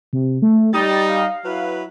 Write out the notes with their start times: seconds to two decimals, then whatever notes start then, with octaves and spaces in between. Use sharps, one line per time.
0.13 C3
0.42 A3
0.73 G3 D#4 A6
1.09 F5
1.45 F#3 E4 B4